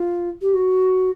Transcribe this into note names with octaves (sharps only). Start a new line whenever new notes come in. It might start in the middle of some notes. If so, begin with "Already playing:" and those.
Already playing: F4
G4
F#4